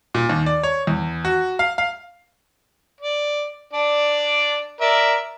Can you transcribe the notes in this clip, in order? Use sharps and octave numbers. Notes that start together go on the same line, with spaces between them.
A#2
D#2
D5
C#5
E2
F#4
F5
F5
D5
D4 D5 D6
A#4 D5 E5